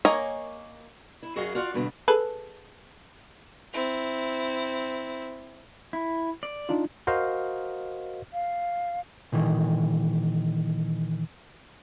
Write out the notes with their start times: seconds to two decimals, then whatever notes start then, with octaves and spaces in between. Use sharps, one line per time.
0.05 A#3 A#4 C#5 D#5 G#5
1.23 E4
1.36 F#2 F#4 G#4 D#5 F5
1.55 F4 F#4 D5 F5
1.74 G2 B2 D3 B3
2.08 G#4 A4 B4
3.73 C4 E4
5.93 E4
6.43 D5
6.69 D4 D#4 F4
7.07 F#4 A#4 C5 D#5 F5
8.33 F5
9.32 A#2 D#3 E3